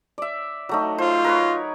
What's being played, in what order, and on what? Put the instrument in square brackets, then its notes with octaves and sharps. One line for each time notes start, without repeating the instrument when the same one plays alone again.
[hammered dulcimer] D5 E5
F#3 A3 D#4
[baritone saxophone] F4 [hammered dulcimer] C5
[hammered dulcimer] A#4 B4 C#5